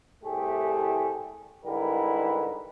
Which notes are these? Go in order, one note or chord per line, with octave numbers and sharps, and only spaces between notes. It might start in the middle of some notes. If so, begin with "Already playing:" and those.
C2 A2 G3 A3 G4 G#4
G#2 D3 G3 E4 A#4 B4